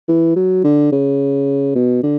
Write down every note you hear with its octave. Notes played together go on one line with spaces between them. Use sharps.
E3
F#3
D3
C#3
B2
D3